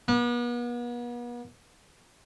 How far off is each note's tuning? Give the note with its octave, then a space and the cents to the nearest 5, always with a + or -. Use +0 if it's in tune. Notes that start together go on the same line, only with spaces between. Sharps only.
B3 -40